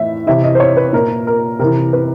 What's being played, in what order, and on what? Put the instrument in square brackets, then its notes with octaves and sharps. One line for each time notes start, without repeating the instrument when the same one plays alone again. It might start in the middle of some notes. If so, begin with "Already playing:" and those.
Already playing: [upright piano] A2 E3 E5
C3 E3 E5
D#5
C5
C#5
B4
A#2 A#4
A#4
C3 E3 A#4
B4